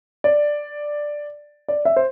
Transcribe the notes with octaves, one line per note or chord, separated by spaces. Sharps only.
D5
D5
E5
C5